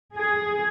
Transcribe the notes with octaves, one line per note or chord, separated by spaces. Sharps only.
G#4